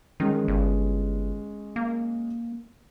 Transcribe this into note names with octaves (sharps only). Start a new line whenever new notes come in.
D#3 G#3 C#4
G1
A#3